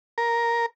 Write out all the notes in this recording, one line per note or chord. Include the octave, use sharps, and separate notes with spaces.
A#4